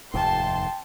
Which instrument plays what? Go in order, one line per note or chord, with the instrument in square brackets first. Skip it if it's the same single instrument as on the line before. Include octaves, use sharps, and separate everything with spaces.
[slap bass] F1 D#2 G#2 [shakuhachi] G5 [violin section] A5 C6